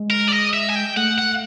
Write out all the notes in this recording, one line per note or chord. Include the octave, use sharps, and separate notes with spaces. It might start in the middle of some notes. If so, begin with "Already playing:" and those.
Already playing: G#3
A#4
D5
D#5
E5
G#5
G5
A3 F#5
F#5